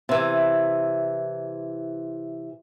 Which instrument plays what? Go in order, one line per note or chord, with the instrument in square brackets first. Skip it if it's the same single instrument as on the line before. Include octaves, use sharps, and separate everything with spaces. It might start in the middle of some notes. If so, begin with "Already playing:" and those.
[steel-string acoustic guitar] C3 E3